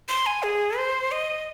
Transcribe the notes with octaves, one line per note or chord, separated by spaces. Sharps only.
C6
G#5
G#4
C5
D#5